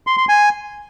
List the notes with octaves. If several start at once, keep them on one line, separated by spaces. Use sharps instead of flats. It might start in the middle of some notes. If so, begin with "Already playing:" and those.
C6
C6
G#5